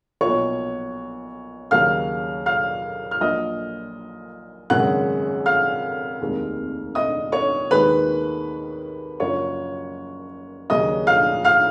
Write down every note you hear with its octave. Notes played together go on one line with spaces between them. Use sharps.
B1 A#2 F3 C#5 C#6
D#2 C#3 F#3 F5 F6
F5 F6
F6
A#1 A#2 F#3 D#5 D#6
G#1 F#2 C#3 G#3 F#5 F#6
F5 F6
F1 D#2 D#3 G#3
D#5 D#6
C#5 C#6
D#2 D#3 G#3 B4 B5
F#1 F#2 F3 C#5 C#6
D#2 C#3 F#3 D#5 D#6
F5 F6
F5 F6